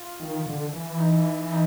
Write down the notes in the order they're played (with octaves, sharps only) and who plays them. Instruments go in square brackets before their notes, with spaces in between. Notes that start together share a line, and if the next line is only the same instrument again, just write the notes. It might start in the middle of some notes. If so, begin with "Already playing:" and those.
Already playing: [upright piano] F4
[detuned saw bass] D#3
D3
E3
[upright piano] D#4
D#4